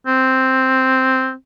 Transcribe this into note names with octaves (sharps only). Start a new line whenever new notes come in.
C4